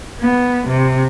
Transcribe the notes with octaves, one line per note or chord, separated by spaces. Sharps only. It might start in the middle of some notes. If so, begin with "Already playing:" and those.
B3
C3